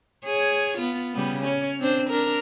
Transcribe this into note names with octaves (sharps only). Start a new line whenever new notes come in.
G#4 C#5
B3 F4
C#3 G3 B3
C#4 C#5
C4 D4 C5
D4 A#4